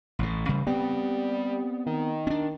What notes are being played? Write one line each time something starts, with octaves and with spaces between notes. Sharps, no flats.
A1 A2
C#3 G3
G3 B3 C4
D#3
C#4 D4